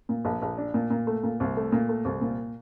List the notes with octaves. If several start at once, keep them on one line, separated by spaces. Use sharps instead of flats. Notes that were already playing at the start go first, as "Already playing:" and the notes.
A#2
A#1
A#1
D4
A#2
A#2
A3
A#2
C2
A3
A#2
A3
C2
A#2